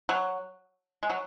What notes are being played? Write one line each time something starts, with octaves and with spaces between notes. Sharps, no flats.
F#3
G#3
F#3